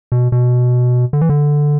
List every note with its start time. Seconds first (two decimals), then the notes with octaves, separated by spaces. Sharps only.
0.12 B2
0.32 B2
1.13 D3
1.21 E3
1.29 D3